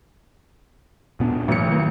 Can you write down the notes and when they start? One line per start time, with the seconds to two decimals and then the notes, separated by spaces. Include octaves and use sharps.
1.20 A#2 B3 D4
1.48 A1 G#2 B2 F#3 C#7
1.67 D#3 E3 A#3